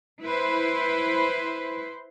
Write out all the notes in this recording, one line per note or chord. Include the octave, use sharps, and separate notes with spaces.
E4 B4 C5